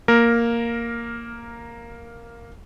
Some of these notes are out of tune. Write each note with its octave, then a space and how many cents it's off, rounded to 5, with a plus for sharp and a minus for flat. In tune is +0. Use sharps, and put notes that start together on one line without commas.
A#3 +0 A#4 +0